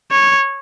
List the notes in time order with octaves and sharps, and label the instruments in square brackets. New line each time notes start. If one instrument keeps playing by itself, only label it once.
[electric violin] C#5